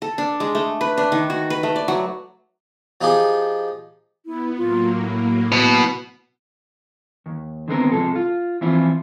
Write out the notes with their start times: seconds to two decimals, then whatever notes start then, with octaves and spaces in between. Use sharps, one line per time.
0.02 A4
0.18 D4
0.40 G#3
0.55 A3
0.81 B4
0.98 D4
1.12 D#3
1.30 F#4
1.50 B4
1.63 A3
1.76 D5
1.88 F#3
3.01 F3 D#4 F4 G4 G#4
4.26 B3 E4
4.57 A2 F#3 A#3 F4
5.01 E4
5.52 B2 B3
7.26 D#2
7.68 D3 D#3 G#3 B3 C4 A#4
7.92 C3 D#3 F3 G#3 A4
8.16 F4
8.61 E3 F3 C4 E4 F4